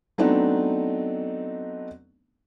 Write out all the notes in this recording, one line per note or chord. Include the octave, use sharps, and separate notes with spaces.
F#3 A3 B3 C4 D4 D#4